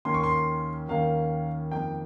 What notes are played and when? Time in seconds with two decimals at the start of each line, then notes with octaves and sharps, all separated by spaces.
0.05 D#2 D#3 A#3 C#4 C6
0.14 C#6
0.24 C6
0.89 D#2 D#3 A#3 C#4 F5
1.71 F2 D#3 A#3 G5